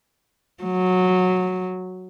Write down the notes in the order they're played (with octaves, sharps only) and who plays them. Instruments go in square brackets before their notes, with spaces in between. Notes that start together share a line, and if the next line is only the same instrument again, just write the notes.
[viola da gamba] F#3